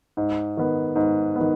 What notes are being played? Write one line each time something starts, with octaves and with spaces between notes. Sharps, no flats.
G#2
D#3 B3
G#2
D#3 B3